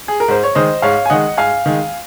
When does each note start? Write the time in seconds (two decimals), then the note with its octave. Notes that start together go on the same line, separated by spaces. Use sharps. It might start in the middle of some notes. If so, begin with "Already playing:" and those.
0.08 G#4
0.20 A#4
0.28 G#2 C5
0.44 C#5
0.55 D#3 G#3 C5 D#5
0.82 G#2 C#5 F5
1.06 G#5
1.10 D#3 G#3 D#5 F#5
1.37 G#2 F5 G#5
1.66 D#3 G#3